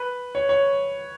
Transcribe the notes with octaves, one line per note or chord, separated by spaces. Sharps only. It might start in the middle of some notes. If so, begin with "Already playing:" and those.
Already playing: B4
C#5
C#5